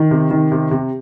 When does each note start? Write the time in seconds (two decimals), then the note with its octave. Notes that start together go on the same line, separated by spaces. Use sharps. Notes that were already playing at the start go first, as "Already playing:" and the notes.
Already playing: D#3
0.11 C3
0.31 D#3
0.52 C3
0.71 C3